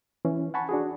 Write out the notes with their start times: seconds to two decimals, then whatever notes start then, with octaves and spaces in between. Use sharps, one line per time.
0.25 E3 C#4
0.54 F#5 G#5 A5 B5 C#6
0.69 D4 F#4 G#4